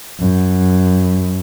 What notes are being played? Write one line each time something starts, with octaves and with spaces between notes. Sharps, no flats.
F#2